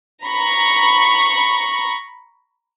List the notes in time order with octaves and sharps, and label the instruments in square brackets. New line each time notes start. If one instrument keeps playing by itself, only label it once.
[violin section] A#5 B5 C#6